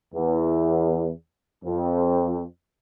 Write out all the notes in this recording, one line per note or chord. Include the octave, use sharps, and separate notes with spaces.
E2
F2